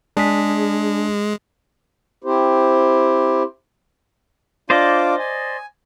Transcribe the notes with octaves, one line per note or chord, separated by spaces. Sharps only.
G#3 D4 G#4 B6
C4 E4 G4 C5
D4 F4 C5 D5 D#5 D6
G#5